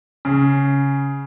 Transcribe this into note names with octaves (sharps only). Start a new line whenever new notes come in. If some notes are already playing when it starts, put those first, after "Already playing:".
C#3